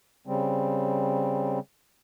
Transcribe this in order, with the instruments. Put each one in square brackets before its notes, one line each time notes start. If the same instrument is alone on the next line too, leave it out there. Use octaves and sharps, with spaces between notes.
[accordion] C#3 G3 C4